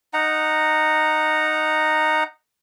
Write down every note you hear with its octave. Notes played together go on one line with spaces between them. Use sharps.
D#4 F#5 A#5